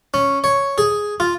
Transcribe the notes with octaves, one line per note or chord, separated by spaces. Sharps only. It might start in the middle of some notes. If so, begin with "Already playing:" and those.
C#4
C#5
G#4
F4